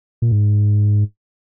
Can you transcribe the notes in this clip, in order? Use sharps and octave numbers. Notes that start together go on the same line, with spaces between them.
A#2
G#2